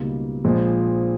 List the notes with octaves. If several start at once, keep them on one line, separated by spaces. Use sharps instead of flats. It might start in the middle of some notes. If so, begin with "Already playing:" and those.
Already playing: C#2 B2 G3 A#3 D#4
A#1 A#2 F3 G#3